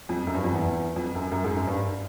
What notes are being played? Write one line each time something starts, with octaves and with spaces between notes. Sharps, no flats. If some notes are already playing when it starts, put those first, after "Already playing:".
F2
F#2
G2
F2
E2
F2
F#2
F#2
G#2
F#2
G2